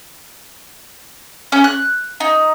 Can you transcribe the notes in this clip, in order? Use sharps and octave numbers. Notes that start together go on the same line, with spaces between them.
C#4
F#6
D#4